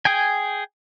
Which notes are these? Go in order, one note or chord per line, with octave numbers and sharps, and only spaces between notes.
G#4 G5 G#5